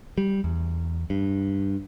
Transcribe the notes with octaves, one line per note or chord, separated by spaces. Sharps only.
G3
E2
G2